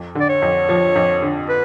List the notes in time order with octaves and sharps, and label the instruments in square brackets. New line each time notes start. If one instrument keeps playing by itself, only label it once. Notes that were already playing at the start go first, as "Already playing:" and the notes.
Already playing: [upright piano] F2
D3
[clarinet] D5
C#5
[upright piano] F2
F3
F2
D3
[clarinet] B4